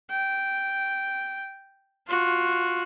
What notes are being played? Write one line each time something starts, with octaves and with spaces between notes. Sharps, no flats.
G5
F4 F#4